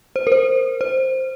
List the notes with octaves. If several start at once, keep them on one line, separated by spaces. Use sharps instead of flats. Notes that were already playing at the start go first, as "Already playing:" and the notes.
C5
A#4
C5
C5